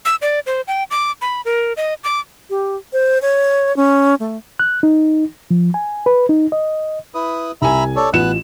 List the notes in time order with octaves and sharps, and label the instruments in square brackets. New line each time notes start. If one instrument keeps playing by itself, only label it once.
[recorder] E6
D5
C5
G5
D6
B5
A#4
D#5
D6
[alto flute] G4
C5
C#5
C#4
A3
[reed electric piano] F#6
D#4
F3
G#5
B4
D#4
D#5
[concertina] E4 B4 D#6
[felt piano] C2 G#5 [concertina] E5 A#5 B5
[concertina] A4 C#5 D5
[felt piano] A1 F4 E7 [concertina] B3 F#6